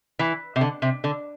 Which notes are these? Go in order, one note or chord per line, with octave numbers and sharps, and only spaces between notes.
E3
C3
D3
C3
D3